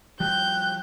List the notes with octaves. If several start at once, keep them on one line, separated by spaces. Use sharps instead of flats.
F3 G3 G4 F#6 G6